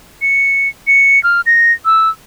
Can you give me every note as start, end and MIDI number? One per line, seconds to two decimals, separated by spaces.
0.22 0.69 97
0.87 1.22 97
1.24 1.41 89
1.46 1.72 94
1.85 2.09 88